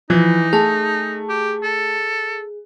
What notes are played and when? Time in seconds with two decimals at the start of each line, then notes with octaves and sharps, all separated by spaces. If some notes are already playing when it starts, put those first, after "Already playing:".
0.10 E3 F3 D#4
0.53 A3 G#4 A5 F7
1.29 G4
1.63 A4